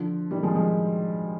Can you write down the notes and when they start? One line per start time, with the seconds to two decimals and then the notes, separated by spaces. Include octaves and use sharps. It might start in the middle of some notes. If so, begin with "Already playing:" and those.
Already playing: D3 F3
0.31 D#3 G3
0.43 F3 G#3
0.55 F3 G#3